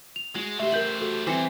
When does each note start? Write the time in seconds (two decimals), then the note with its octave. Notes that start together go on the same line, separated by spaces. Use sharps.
0.16 F7
0.35 G#3 F#4
0.59 A3 G4 C5 E5
0.72 G4 A#4 G6 F#7
1.01 F#4 A4
1.27 E3 C4 E4 C5 D6 C#7